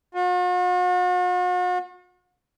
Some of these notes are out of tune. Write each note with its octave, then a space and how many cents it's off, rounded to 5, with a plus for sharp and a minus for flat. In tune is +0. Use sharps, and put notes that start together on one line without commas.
F#4 -45